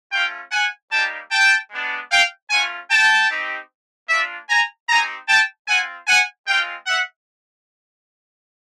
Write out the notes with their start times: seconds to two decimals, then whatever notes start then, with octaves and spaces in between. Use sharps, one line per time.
0.12 A3 C#4 F4 F5 G5
0.51 F#5 G#5
0.91 G3 A#3 D#4 G4 G5 A5
1.31 G5 A5
1.70 G#3 B3 D4
2.11 F5 G5
2.50 A3 C#4 F4 F#5 G#5
2.90 G5 A5
3.30 C4 D#4 G4
4.09 A#3 D4 F4 D5 E5
4.49 G#5 A#5
4.89 C4 D#4 G4 G#5 A#5
5.28 G5 A5
5.67 C4 F4 F#5 G#5
6.07 F#5 G#5
6.47 G#3 C4 F4 F5 G5
6.87 E5 F#5